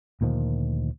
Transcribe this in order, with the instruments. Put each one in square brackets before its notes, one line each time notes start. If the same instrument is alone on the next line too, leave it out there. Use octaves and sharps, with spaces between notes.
[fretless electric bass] D2 A#2 D#3 F3